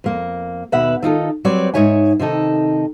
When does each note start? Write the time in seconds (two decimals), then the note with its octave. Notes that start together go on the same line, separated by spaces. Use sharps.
0.04 F2 A#3
0.72 D#2 B2 B4 E5 F#5
1.02 D#3 D#4 F4 A4
1.45 F#3 G3 C4 B4 C#5 D5
1.74 G#2 F3 D#4 C#5 E5 G#5
2.19 C3 D#3 D#4 A4